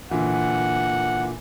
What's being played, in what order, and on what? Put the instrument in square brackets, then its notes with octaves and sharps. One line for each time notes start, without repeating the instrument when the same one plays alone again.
[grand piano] A#2 D3 E3 [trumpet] F#5